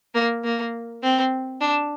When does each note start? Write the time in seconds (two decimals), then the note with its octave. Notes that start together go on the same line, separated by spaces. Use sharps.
0.14 A#3
0.44 A#3
1.03 C4
1.61 D4